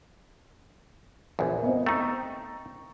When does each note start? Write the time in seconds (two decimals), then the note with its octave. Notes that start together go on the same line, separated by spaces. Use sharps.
1.39 A#1 E2
1.63 B3 C4 D#5
1.86 A3 D#4 G5 A#5 C#6